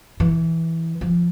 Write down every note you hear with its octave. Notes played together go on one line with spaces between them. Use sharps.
E3
F3